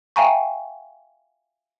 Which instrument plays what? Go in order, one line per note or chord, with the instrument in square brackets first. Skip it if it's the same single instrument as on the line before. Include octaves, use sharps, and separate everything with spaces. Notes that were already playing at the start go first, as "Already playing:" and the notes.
[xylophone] E5 F5 G5 G#5 A#5 C#6